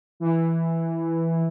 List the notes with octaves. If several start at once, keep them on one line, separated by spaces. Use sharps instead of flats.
E3